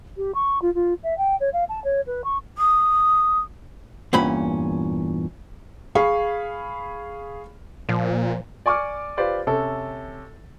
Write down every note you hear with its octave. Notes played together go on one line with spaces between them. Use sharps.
G4
C#6
F4
F4
E5
G5
C#5
F5
A5
C#5
B4
C#6
D#6
E2 G2 A#2 C#4 B5
G#4 F5 B5 C#6
A#2 F3
D5 G#5 C#6 D6 F6
F4 G4 B4 C5 D5
C3 C#4 A4